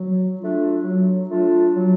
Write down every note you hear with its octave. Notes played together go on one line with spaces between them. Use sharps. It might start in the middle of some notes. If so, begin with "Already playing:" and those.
Already playing: F#3
A3 D4 F4
F#3
A3 D4 F4
F#3